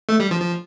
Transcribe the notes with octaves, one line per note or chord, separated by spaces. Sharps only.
A3
G3
F3
F3